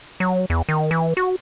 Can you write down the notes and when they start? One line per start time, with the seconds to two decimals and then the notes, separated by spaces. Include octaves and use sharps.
0.20 F#3
0.50 E2
0.69 D#3
0.91 E3
1.17 F#4